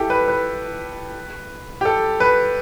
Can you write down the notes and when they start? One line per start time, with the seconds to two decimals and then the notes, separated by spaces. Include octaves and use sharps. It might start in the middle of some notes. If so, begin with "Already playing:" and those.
Already playing: E4 G4 A4
0.10 B4
0.28 B4
1.81 G4
1.85 A4
2.20 B4